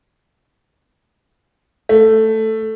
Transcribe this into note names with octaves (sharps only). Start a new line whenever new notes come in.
A3